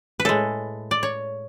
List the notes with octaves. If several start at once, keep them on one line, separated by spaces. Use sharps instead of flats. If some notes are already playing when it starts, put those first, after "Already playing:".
B4
A2 G#3 A4
D5
C#5